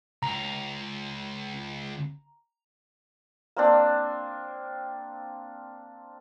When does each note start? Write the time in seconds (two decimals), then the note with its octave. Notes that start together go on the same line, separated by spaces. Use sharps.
0.23 C#2 A#5
3.56 A#3 C4 D4